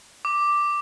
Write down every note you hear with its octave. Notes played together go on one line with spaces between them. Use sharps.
D6